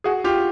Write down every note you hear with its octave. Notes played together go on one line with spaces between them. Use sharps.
F#4 G#4
F4 G4